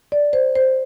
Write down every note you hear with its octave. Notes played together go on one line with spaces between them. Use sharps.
D5
C5
C5